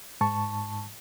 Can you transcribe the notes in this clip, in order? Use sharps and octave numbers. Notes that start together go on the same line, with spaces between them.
G#2 A5 C#6